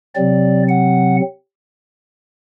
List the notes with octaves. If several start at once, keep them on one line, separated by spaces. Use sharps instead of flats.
C3 F#3 C4 D5
F#5